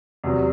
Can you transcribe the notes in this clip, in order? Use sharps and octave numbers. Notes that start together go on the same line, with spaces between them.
E2 C3 F#3